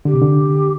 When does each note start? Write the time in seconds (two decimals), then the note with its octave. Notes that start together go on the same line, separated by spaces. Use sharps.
0.05 D3 G4
0.14 C3
0.22 D3